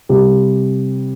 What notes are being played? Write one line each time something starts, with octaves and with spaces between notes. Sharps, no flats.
C3 G3